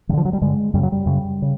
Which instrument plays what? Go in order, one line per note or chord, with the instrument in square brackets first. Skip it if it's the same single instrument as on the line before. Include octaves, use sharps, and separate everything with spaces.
[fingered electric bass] G2 E3
D3 F3
F#3
G3
G2 D3 G#3
F#2 C#3 G3
F#3
G3
F#2 C#3
C#3